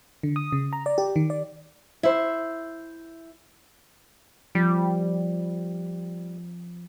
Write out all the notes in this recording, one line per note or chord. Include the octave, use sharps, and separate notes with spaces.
D3
D#6
C#3
A#5
D5
G4
D#3
D5
E4 C5
F3 G3